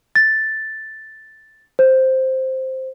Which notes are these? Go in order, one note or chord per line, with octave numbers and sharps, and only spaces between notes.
A6
C5